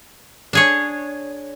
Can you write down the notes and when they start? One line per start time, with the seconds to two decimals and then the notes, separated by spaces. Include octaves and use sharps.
0.53 D4 G#4 C#5